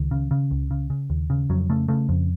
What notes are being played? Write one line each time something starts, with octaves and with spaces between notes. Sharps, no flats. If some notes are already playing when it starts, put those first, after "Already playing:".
Already playing: C#2 D#3
C#3
C#3
C#2
C#3
C#3
D#2
C#3
F2 F#3
C#3 A3
C#3 A3
F2